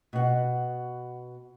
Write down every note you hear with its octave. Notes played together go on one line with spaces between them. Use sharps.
B2 F#5